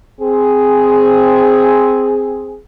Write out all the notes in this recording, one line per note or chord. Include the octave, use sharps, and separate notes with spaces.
C4 G#4